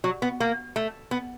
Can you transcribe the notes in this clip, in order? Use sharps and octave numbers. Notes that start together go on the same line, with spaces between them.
F#3
B3
A#3
A3
B3